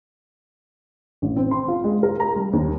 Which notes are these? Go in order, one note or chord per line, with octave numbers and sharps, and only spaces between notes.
A1
C4
C6
F4
G#3
A#4
A#5
G3
D#2